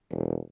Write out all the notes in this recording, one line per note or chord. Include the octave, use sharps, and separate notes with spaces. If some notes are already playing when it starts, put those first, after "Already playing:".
E1